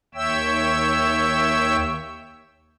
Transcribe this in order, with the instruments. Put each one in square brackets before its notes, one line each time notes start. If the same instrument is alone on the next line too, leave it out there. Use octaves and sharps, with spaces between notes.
[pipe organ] D#2 C#5 E5 G5 E6